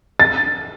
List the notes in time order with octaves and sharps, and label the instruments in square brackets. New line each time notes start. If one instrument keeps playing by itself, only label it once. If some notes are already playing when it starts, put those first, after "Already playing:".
[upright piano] A6